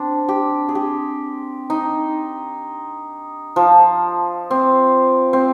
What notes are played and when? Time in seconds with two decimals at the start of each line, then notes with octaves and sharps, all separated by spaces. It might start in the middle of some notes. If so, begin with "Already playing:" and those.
Already playing: C4 D4
0.29 G4
0.69 G#4
0.75 G4
1.70 D#4
3.56 F3
4.51 C4
5.33 C4